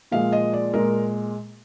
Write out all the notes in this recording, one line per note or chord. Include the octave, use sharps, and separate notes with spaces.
A#2 F3 G#3 F5
D#5
D5
A#2 G#3 A#4